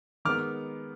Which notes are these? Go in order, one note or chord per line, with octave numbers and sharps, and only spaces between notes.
D#3 G#3 B3 D6 F6